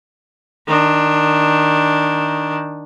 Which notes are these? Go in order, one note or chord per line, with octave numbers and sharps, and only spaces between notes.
D#3 D4